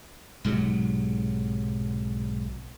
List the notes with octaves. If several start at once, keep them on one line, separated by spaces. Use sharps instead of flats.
B1 G#2 C3 F#3